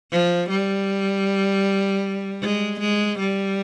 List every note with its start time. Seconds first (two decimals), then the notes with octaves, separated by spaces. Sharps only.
0.12 F3
0.50 G3
2.42 G#3
2.80 G#3
3.19 G3